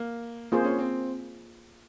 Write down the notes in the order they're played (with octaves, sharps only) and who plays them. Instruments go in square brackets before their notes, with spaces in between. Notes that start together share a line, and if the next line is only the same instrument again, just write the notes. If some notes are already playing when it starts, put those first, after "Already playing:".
Already playing: [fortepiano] A#3
[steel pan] A#3 F4 G#4 C5 [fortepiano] C4
[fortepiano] C#4
C4